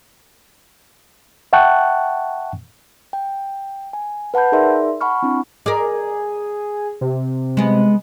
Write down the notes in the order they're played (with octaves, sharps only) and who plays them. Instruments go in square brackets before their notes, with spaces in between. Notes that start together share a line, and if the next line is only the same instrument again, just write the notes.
[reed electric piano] E5 F#5 G5 A5 C#6 F#6
[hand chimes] G5
G#5
B4 F#5 A5 B5 G6
D#4 G#4 A#4 D5 E5 C6
F#5 A5 B5 C#6 F6
C4 D4 E4
[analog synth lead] G#4 [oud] A#4 D5
[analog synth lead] C3
[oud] G#3 B3